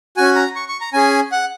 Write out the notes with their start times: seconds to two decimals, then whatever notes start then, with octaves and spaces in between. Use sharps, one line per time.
0.17 C#4 F#4 G#5
0.36 A#5
0.56 C#6
0.68 C#6
0.81 A#5
0.93 C#4 G#4 G#5
1.32 F#5